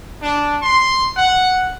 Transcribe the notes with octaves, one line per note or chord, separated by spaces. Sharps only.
D4
C6
F#5